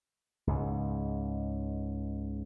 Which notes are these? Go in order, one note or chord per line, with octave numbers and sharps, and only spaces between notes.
C#2 G#2